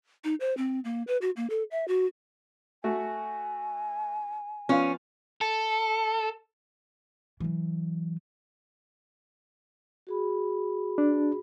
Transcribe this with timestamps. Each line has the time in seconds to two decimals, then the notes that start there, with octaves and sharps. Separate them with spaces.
0.24 D#4
0.40 C5
0.57 C4
0.84 A#3
1.07 B4
1.21 F#4
1.36 A#3
1.50 A4
1.71 E5
1.88 F#4
2.84 A3 F#4 G#5
4.69 F3 B3 C#4 F5
5.41 A4
7.40 E3 F#3
10.07 F#4 G#4 B5
10.98 D4